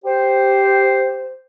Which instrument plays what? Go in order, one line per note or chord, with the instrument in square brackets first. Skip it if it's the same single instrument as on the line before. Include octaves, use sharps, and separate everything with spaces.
[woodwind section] G4 C5